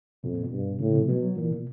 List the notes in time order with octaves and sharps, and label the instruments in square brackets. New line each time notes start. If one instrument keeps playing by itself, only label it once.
[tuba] F2 [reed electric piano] B2
[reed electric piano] A#2
B2
[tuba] G2
[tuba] A2 [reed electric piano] C#3
[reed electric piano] C3
F3
[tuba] B2 [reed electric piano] F#3
[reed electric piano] F#3
[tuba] A#2 [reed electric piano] E3
[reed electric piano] B2